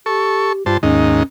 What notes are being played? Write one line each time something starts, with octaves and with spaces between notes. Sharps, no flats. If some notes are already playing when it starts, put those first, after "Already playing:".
G4 A4 C#6
G2 F4 C5 A5
D#2 G#2 C#4 D#4